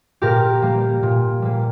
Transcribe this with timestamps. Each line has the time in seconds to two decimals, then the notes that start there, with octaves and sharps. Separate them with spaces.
0.22 A#2 G4 A#4
0.62 G3 A#3
1.03 A#2
1.42 G3 A#3